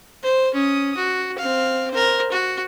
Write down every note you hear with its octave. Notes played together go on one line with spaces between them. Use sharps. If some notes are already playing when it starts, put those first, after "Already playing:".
C5
C#4 D#6
F#4
C4 F5
A#4 C5
F#4